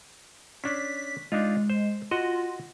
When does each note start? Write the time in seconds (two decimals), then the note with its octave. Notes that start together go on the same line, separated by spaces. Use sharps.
0.64 C#4 D4 B6
1.32 G#3 D4 D#4 F4
1.70 C5
2.11 F4 F#4 D#5